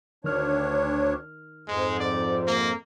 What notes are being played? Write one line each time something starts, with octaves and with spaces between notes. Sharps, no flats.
D2 D#3 D4 C#5 F6
F2 G#2 G#3
D5
A#3